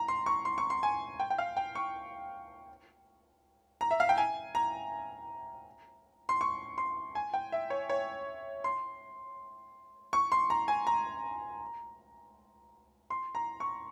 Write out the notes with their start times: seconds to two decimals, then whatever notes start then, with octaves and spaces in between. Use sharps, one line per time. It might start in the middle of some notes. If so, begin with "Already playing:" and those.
Already playing: A#5
0.08 C6
0.26 C#6
0.45 C6
0.58 C#6
0.70 C6
0.83 G#5
1.20 G5
1.30 G5
1.38 F5
1.57 G5
1.75 C#6
3.81 A#5
3.91 E5
4.00 F5
4.09 G5
4.18 G#5
4.55 A#5
6.29 C6
6.41 C#6
6.78 C6
7.15 G#5
7.33 G5
7.52 E5
7.70 C#5
7.89 C#5
8.64 C6
10.13 C#6
10.32 C6
10.50 A#5
10.68 G#5
10.87 A#5
13.10 C6
13.35 A#5
13.60 C#6